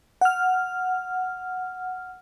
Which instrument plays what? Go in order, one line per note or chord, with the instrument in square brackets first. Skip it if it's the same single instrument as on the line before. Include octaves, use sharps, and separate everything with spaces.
[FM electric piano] F#5 F6